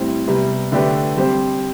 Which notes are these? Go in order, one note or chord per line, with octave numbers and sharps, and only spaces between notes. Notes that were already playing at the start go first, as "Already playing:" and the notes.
Already playing: A2 G3 C4
C3 G3 B3
D3 A3 D4 G4 B4
G3 C4 G4 C5